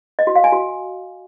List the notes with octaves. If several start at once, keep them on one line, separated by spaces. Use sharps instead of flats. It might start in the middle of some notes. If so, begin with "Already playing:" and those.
D#5
F#4
F5
G#5
F#4